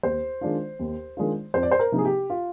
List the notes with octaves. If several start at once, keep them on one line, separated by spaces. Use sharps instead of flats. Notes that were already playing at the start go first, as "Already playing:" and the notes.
D#2 C5
D#3 G#3 D4 F4
D#2
D#3 G#3 D4 F4
F2 C5
D5
C5
A#4
C3 F3 A#3 D#4
G#4
G4
F4